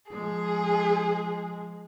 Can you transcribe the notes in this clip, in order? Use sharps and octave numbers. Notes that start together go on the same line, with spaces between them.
F3 G#3 G#4